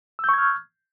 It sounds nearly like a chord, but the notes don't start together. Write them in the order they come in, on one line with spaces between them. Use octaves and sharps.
E6 G6 C#6 G#6 F6